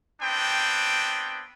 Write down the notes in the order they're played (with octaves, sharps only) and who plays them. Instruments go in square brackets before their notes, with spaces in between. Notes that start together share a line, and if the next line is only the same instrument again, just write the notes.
[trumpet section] B3 C4 D4 G5